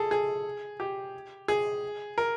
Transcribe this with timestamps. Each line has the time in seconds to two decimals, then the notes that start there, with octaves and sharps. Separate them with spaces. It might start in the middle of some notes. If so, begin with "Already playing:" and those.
Already playing: G#4 A4
0.11 G#4
0.80 G4
1.48 G#4
2.18 A#4